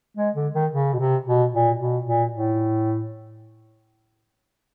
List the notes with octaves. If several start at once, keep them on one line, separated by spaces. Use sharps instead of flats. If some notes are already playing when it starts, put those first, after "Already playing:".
G#3
D3
D#3
C#3
B2
C3
B2
A#2
B2
A#2
A2